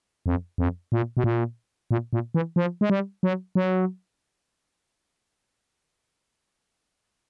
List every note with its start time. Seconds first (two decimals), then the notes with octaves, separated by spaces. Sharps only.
0.26 F2
0.58 F2
0.92 A#2
1.17 B2
1.24 A#2
1.91 A#2
2.13 A#2
2.34 E3
2.56 F3
2.81 G#3
2.90 G3
3.23 F#3
3.55 F#3